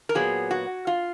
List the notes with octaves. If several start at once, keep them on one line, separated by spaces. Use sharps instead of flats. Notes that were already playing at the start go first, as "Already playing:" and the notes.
A#4
A#2 F#3 B3 G#4
F#4
F4